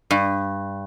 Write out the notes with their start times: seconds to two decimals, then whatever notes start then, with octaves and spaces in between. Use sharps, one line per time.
0.11 G2